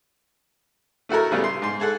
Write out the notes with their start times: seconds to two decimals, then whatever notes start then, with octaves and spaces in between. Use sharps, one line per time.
1.09 A3 E4 F#4 A4 A#4
1.32 C#3 G3 A3 B3
1.44 C6
1.62 G#2 C6
1.80 G#4 A4 F#5